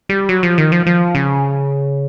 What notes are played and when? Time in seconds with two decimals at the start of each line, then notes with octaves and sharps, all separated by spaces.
0.09 G3
0.29 F#3
0.43 F3
0.58 D#3
0.72 F3
0.87 F3
1.15 C#3